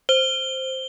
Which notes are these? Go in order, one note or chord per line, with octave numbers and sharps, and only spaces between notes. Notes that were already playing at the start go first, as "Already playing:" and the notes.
C5 G7